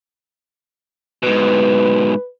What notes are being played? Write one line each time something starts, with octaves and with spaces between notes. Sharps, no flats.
G#2 B2 B4